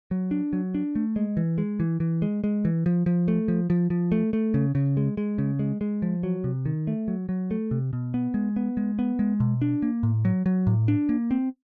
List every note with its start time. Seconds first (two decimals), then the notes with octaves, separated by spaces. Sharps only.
0.11 F#3
0.31 D4
0.53 F#3
0.75 D4
0.95 A3
1.16 G#3
1.37 E3
1.58 G#3
1.80 E3
2.00 E3
2.22 G#3
2.44 G#3
2.65 E3
2.86 F3
3.06 F3
3.28 A3
3.48 F3
3.70 F3
3.90 F3
4.12 A3
4.33 A3
4.54 C#3
4.75 C#3
4.97 G#3
5.17 G#3
5.38 C#3
5.59 G#3
5.81 G#3
6.02 F3
6.23 F#3
6.44 C3
6.66 D#3
6.87 A3
7.08 F#3
7.29 F#3
7.51 A3
7.71 C3
7.93 B2
8.14 B3
8.34 G#3
8.56 B3
8.77 G#3
8.99 B3
9.19 G#3
9.40 B2
9.62 D4
9.82 A#3
10.03 A2
10.25 F#3
10.46 F#3
10.67 A2
10.88 D4
11.09 A#3
11.31 C4